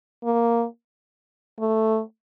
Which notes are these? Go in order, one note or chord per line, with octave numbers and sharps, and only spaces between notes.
A#3
A3